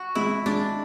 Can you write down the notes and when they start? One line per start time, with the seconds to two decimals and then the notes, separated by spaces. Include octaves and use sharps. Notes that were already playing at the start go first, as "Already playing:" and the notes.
Already playing: F#4
0.15 G#3 E4
0.46 G#3 D4